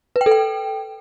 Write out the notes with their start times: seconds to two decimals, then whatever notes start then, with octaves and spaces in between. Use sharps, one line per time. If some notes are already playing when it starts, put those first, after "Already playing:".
0.16 B4
0.21 G5
0.26 A4
0.31 G5